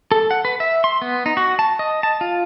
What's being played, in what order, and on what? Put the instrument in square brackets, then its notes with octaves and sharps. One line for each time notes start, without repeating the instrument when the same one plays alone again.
[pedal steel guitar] A4
F#5
B4
E5
C6
B3
D#4
F#4
A5
D#5
A5
F4